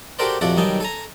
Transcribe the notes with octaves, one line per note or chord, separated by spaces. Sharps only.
F#4 G4 A4 A#4 C5 D5
F2 C3 F#4 A4 D5
B1 D#3 G3 D#4 G#5 A5
A4 G#5 A#5